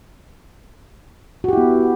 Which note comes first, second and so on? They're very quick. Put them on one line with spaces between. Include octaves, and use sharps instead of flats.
F#4 G4 E4 B3